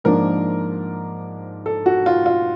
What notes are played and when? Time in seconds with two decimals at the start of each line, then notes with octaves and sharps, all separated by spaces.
0.04 G#2 F3 A#3 D4 A#4
1.66 A4
1.86 F#4
2.06 F4
2.26 F4